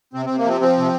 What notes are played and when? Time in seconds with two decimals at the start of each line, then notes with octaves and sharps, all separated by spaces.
0.13 C3 C4
0.26 C3 C4
0.38 A#3
0.45 F3 C4
0.61 F3 C4
0.78 C3